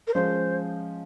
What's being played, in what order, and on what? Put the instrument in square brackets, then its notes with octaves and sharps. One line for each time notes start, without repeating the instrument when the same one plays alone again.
[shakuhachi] A#4
[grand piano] F3 G#3 C#4 [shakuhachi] C5